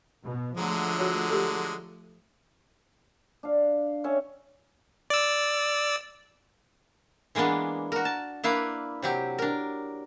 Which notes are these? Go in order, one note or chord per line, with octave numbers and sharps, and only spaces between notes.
B2
D3 F3 F#3 G#3 A3
F#4 C#5
G4 A4
D4 F5
C#4 C#5 E5 G5
D5 E6
E3 G#3 A#3 B3 D4
F#4 A#4
A5
A#3 D4 E4 B4 F5
C3 F#3 G4
D4 A#4